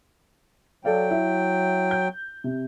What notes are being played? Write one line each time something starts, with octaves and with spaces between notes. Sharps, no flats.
F#3 A4 D5 F5 G5
E4
G6
C3